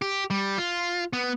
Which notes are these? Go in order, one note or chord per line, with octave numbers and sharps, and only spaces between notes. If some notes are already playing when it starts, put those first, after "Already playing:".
G4
G3
F4
B3